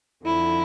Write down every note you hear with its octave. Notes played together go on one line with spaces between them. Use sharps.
F2 D3 F3 E4